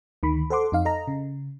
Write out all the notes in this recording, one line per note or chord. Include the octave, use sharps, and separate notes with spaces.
D2 D#3 B5
A4 C5 F#5 C6 D6
F2 D#4 F5
A4 D#5 A#5
C#3